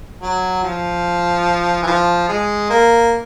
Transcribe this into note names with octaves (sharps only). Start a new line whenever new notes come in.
F#3
F3
E3
F3
G#3
A#3